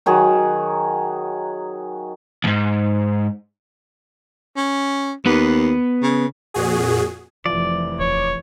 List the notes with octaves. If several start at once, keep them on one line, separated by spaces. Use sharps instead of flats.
D#3 F#3 G#4
D#2 G#2
C#4
D#2 B3 B4
C#3
F2 A#2 F#4 G#4
F1 E3 F3 D5
D#1 C#5